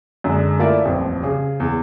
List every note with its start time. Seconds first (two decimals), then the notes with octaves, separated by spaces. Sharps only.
0.24 F#2 D3 G#3
0.59 A3 E4 F4 A#4 D5 E5
0.85 D#1 A1 F2
1.23 C#3 G#4
1.60 E2